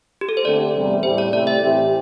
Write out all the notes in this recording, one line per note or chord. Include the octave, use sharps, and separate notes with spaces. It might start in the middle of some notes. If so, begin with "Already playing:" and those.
G4
A4
C5
D3 A3 C4 G4 D5
E2 C3 G3
A2 G3 E4 G4 C5
D5
C3 A3 E4 G4 D5
E5
A2 E3 C4 G4